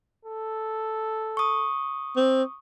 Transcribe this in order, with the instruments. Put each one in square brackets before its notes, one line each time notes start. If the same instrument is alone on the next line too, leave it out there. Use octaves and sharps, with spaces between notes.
[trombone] A4
[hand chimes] C#6 D#6
[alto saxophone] C4